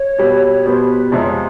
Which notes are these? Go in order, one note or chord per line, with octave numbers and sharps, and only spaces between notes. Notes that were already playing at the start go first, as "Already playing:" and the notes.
Already playing: C#5
B2 G3 B3
B2 G3 B3 C5
B4
F2 C3 F3 G#3 D5
C#5
C5